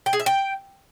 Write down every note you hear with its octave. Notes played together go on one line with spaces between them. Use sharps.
G5
G#4
E5
G5